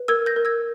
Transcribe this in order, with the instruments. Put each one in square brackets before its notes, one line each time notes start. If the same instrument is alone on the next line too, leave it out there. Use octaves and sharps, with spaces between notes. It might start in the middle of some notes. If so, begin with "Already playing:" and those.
Already playing: [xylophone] B4
A#4 E6 G#6
G6 A#6
A#4
E6 G#6